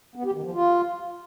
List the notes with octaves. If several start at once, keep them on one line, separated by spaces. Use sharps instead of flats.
B3
G4
D#3
F3
F4